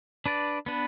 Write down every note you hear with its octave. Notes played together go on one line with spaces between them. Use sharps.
D4 B4 D5
B3 D4 B4